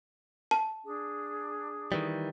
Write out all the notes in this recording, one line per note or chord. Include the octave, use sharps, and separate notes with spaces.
A5
D4 G#4
D#3 E3 G3